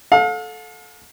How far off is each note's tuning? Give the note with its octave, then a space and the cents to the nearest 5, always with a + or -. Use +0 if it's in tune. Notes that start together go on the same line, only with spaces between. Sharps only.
A4 -15 F5 +40